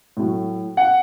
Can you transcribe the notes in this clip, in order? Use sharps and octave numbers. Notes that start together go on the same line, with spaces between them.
A2 F#3 A3
F#5